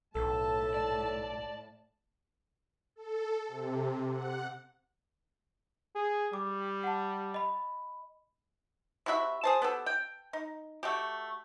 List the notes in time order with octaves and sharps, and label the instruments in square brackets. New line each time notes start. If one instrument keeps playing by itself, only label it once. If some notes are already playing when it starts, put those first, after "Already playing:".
[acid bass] B1 [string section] A2 A5 [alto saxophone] A4
[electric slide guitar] D5
[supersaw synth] A4
C3
F#5
[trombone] G#4
[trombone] G3 [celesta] D6
[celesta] F#5 A5
D#5 B5
[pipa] C3 E4 F#4 E5
G#4 C5 A5
B3 G4 A4
G5
D#4
A3 F#4 G4